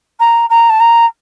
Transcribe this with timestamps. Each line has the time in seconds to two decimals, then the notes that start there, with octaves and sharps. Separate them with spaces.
0.19 A#5
0.50 A#5
0.69 A5
0.80 A#5